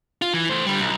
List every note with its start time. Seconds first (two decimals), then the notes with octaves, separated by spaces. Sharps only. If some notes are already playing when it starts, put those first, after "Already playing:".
0.22 F4
0.34 E3
0.49 A3 C5
0.66 D3 G3
0.80 B1